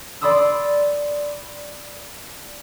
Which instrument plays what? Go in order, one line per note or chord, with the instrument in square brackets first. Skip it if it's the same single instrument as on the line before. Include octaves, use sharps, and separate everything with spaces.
[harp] D5 B5 C6 D#6 E6